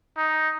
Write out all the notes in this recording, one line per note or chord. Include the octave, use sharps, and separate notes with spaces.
D#4